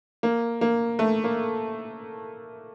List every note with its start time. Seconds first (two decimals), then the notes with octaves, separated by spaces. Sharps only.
0.23 A#3
0.61 A#3
0.99 A3
1.24 A#3